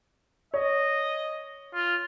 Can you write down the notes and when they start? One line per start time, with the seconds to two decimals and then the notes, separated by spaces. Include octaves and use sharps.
0.54 C#5 D#5
1.74 F4